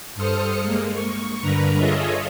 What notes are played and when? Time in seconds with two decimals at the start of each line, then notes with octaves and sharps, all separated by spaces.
0.15 G2 A4 C5 D#6 F6 C#7
0.61 G#3 A#3
0.93 C#6
1.41 G2 D3 A#4 B4 A#5
1.78 F4 G#4 A4 C#5 D#5 E5